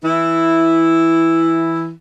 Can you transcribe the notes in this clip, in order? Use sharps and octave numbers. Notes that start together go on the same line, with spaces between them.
E3 E4